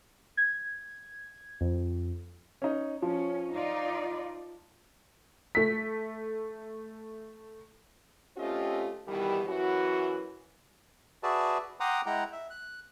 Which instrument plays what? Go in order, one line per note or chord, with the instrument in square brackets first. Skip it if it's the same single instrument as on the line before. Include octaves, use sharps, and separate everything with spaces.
[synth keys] G#6
F2
[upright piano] C#4 D#4
[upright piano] F3 [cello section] C#4
[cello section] D#4 F4 D5
[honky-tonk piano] A3 B6
[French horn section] A3 C4 C#4 F4 G4 D#5
B2 D#3 E3 G3
F#2 E3 F#4
[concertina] F#4 G#4 B4 D5 E5 A5
F#5 G5 A#5 C6 D6 D#6
G#3 E4 F#5 G5 A#5
E5
F#6